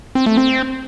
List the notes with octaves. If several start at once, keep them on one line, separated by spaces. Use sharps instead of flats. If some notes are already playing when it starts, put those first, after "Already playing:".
C4
A3
C4